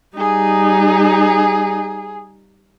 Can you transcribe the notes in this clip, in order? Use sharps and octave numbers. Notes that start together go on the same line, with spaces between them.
G3 D#4 G#4